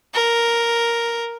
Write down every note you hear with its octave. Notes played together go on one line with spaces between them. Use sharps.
A#4